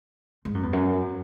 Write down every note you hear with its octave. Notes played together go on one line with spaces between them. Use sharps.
G#2
F#2
E2
F#2